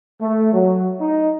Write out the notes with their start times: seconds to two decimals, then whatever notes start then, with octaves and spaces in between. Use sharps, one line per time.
0.22 A3
0.53 F#3
1.01 D#4